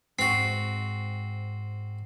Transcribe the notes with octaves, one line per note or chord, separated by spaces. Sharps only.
G#2 C4 F#4 C7